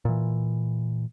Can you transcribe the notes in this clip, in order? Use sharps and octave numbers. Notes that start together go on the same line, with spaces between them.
A#2 E3